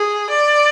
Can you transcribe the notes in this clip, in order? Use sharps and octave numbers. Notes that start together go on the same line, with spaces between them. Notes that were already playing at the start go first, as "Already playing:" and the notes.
Already playing: G#4
D5